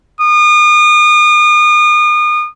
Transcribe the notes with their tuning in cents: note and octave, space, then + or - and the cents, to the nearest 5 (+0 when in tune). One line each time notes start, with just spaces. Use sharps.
D#6 -35